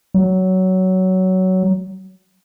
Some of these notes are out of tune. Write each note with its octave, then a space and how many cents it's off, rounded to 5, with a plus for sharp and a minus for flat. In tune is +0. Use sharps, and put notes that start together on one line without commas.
F#3 +15